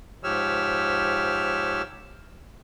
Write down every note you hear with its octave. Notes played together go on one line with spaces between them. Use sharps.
G#2 F3 G4 C#5 E6 F6